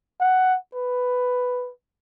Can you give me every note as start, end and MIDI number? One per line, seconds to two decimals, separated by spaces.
0.21 0.57 78
0.74 1.71 71